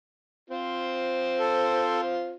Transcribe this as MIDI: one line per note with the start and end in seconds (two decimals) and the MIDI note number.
0.50 2.35 60
0.50 2.35 65
0.50 2.35 72
1.39 2.01 69